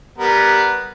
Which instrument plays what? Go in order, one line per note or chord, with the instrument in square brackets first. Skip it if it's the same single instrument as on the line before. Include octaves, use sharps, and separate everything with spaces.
[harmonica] G3 B3 A#4